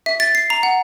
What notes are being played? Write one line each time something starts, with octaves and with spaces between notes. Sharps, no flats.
E5
A6
C7
A#5
F#5